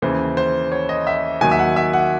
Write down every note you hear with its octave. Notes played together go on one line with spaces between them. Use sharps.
D#2 C#3 E3 C5
C5
C#5
D#5
E5
D#2 D#3 F#3 G#5
E5
F#5
E5
F#5